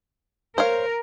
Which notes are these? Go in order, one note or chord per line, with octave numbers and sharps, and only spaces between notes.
A#4 C5 C#5 F5